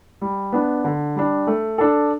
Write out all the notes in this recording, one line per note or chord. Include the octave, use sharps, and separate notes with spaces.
G3
B3 D4
D3
G3 D4
A3
D4 A4